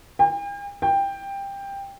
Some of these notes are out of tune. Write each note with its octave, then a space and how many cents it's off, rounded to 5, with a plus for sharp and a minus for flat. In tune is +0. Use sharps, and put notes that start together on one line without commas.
G5 +45
G5 +15